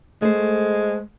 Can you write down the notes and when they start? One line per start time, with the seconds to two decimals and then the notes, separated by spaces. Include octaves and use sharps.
0.22 G#3 A3 C5